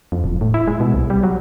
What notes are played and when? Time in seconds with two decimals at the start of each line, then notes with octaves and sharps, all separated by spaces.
0.12 F2
0.24 E1
0.41 A2
0.54 E4
0.67 G#3
0.80 B2
0.94 C2
1.10 G3
1.23 F#3